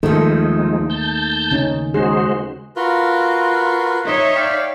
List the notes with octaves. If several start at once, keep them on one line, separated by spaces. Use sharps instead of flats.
D#2 D#3 F3 G#3 A3 D#4 A4
A5 G6
C#3 C#4 D#4
G#3 D#4 F#4 G#4 C5
F4 F#4 A#4 B4
D#4 C#5 D#5 E5 C6
D5 F5 G5